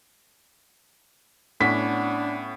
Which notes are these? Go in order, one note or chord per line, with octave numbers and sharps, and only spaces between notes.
A2 B3 C#4 D4 B6